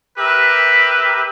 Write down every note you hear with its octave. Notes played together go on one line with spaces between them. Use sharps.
G4 A#4 B4 E5